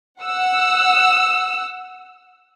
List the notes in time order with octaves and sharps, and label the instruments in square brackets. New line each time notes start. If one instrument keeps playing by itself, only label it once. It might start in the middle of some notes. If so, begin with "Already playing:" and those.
[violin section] F#5 E6